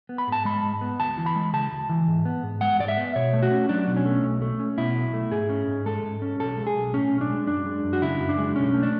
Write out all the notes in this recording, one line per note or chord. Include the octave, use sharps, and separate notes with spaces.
B3
B5
G#2 A5
G#3 B5
G#2
B3
D2 A5
E3
B5
G#3
C#3 A5
D2
E3
G#2
B3
G#2
G#3 F#5
G#2 D5
E5
B3
B2 C#5
A3
F#4
C#4
F#3 D4
B2
C#4
A3
B1
A3
C#4
B2 E4
B1
A3
G#2 G#4
C#4
G#2
G#3 A4
G#2
C#4
B1 A4
G#3
G#4
B1
A2 C#4
B1
D4
G#3
F#2 D4
G#3
F#2
F#4
C#3 E4
F#2
D4
G#3
B1 C#4
A3
D4